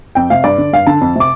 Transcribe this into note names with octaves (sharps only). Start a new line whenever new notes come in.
F2 G5
C3 F5
G2 D5
D3
G2 F5
D3 A5
F2
C3 D6